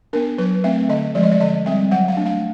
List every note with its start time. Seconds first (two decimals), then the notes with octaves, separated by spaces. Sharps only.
0.13 B3 D4 A#4
0.38 F#3 B4
0.64 A3 C4 E5
0.89 D3 D#5
1.15 F3 G#3 D5
1.23 D#5
1.32 D5
1.40 D3 D#5
1.66 G3 C4 E5
1.91 F#3 F#5
2.08 F5
2.17 A3 D4
2.26 F5